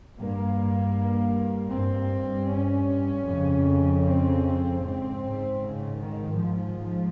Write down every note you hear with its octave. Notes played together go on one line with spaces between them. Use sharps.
G2 A#3
G2 C4
C#4
F2 C#3
C4
G#2 C4
C#3
D#3
G#2 F3